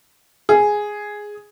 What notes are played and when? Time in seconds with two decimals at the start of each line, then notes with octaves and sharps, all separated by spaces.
0.49 G#4